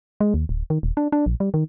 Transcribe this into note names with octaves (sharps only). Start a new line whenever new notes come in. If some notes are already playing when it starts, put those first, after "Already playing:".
G#3
D#2
D1
D#3
D#1
D4
D4
A#1
G3
D#3